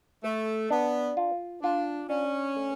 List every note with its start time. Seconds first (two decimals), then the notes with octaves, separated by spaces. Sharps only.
0.24 A3 A4
0.70 B3 D4
1.17 F4
1.63 D4 F4
2.09 C#4 D4
2.56 A3